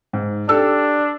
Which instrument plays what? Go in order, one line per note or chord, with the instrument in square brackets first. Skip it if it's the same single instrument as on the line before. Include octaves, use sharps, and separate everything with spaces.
[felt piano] G#2
[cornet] D4 [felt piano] G4 A4 E6